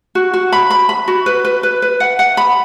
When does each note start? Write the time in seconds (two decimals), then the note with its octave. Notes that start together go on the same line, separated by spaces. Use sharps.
0.15 F#4
0.34 F#4
0.52 B5
0.70 B5
0.89 B5
1.08 F#4
1.26 B4
1.45 B4
1.63 B4
1.82 B4
2.00 F#5
2.19 F#5
2.37 B5